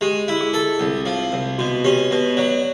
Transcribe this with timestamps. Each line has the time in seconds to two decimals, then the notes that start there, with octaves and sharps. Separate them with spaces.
0.01 G#3 G4
0.28 E4
0.41 G#4
0.54 A4
0.80 C2
1.06 F3
1.32 C2
1.58 B2 F#4
1.85 C#4 G4
2.11 B2
2.37 F#3 D5